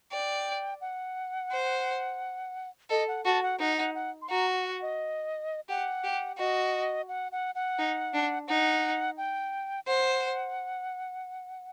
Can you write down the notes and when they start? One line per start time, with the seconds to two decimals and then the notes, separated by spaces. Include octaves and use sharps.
0.12 D5 G5
0.81 F#5
1.51 C5
2.90 A4 D#5
3.08 F#5
3.25 F#4 A5
3.43 F#5
3.60 D#4 F#5
3.77 F#5
3.95 F#5
4.22 C6
4.30 F#4 A#5
4.64 F#5
4.82 D#5
5.69 G4 F#5
6.04 G4
6.38 F#4 D#5
7.08 F#5
7.32 F#5
7.55 F#5
7.79 D#4
8.14 D4
8.48 D#4 F#5
9.17 G5
9.87 C5 F#5